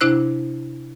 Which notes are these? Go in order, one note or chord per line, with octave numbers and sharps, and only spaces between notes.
C3 D4 E4 C5 E6 F#6